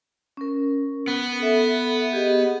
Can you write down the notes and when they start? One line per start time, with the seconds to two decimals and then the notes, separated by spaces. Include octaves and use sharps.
0.37 C#4 A#4
1.08 B3
1.40 A4 E5
2.13 G4 G#4 D#5